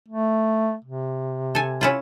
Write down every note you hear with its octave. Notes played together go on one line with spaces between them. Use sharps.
A3
C3
A4 G#5
C#4 E4 F4